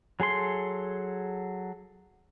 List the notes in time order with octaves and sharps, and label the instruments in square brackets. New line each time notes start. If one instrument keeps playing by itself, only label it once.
[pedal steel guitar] F#3 G#4 A4 C6